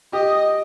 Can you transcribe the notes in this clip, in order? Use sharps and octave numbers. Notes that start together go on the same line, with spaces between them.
G4 D#5